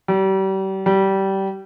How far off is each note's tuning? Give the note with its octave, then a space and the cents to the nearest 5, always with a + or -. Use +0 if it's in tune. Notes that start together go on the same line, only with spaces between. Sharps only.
G3 -35
G3 -20